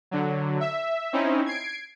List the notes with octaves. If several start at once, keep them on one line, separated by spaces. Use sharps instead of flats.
D3 F#3
E5
C4 C#4 D#4 E4
G#6 C7 D7